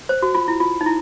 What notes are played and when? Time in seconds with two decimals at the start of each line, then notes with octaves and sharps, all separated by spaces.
0.09 C5
0.22 F#4
0.35 F4
0.48 E4
0.60 F4
0.81 D#4
0.86 E4